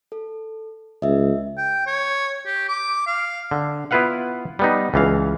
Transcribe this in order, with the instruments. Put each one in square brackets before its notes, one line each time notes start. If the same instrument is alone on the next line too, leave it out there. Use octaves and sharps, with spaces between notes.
[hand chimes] A4
[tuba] C#2 [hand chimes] D#5 E5
[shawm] G5
C#5
G4
D6
F5
[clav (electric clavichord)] D3
B3 E4 F4 B4 F5 F#5
G3 B3 D#4
C#2 E3 F5